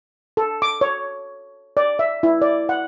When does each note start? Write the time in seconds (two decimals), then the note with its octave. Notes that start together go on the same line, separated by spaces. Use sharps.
0.37 A4
0.62 D6
0.81 C#5
1.77 D5
1.99 E5
2.23 E4
2.42 D5
2.69 F#5